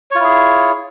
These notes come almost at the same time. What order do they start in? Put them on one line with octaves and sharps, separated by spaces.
C#5 F4 E4 G#4